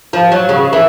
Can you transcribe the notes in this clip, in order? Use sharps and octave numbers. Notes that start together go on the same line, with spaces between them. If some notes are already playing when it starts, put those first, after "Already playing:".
F3
F#3
C#3
E3